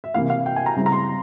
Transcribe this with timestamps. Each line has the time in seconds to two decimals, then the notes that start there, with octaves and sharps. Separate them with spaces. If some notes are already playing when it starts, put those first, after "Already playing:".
0.04 E5
0.14 C3 E3 A#3 E4 F5
0.30 F5
0.46 G5
0.56 G#5
0.66 A#5
0.76 C#3 G3 C4 E4
0.86 A#5
0.92 C6